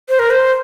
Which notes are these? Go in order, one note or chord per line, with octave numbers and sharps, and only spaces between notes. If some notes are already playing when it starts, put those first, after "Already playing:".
C5
A#4
C5